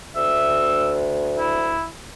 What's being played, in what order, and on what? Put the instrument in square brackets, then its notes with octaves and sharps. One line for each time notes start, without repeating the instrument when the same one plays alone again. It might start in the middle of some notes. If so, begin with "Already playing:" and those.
[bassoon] D2 [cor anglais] E5
[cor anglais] E4